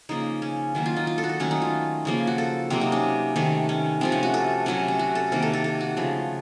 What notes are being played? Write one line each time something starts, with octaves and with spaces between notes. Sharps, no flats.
C#3 F3 A#3 D#4
C#4
D#3 F#3 A#3
F4
D#4
F4
A4
F#4
A4
D#3 F#3 A3 C#4
D#4
F4
C#3 F3 A#3
F#4
A4
C3 F#3 A#3 C4
D#4
C#4
C3 D#3 A3
C#4
C3 F3 A3 C4
C#4
F#4
A4
C3 F#3 A3 C#4
C#4
F#4
A4
C3 D#3 A#3 A#4
A4
A4
A4
F#4
C#3 F3 A3